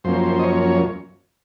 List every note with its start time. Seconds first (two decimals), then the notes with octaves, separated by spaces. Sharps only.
0.04 F#2 F3 A#3 C#4 C5
0.24 C5
0.39 D#5
0.43 C#5
0.63 C#5